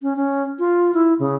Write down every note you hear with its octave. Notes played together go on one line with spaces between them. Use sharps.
C#4
C#4
F4
E4
C#3